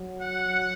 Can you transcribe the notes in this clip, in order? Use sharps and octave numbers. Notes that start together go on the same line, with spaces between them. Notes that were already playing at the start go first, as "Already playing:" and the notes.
Already playing: F#3
F#5